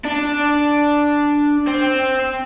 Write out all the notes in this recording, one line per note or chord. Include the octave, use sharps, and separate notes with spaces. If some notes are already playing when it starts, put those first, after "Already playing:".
D4
C4